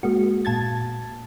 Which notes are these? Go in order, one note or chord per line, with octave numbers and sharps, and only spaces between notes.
G#3 A#3 F#4
A#2 A5 G#6 A6